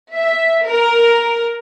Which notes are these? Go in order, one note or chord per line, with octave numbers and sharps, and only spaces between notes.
E5
A#4